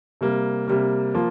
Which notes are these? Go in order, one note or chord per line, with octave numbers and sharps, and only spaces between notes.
C3 G3 A#3
C3 G3 A#3
F3 A#3 F4